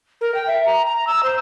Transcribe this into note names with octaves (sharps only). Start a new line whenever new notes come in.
A#4
G5
E5
A#5
A#5
E6
C5